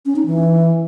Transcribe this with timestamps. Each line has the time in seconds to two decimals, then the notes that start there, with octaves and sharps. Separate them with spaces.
0.06 C#4
0.16 D#4
0.26 E3